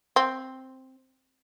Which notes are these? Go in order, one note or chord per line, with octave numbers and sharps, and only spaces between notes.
C4